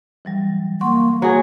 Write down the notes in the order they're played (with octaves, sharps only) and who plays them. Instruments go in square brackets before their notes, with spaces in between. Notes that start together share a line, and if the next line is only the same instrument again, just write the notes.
[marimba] E3 F#3 G3
[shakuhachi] A#3 [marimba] F#5 C6 C#6
[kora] F#3 G#4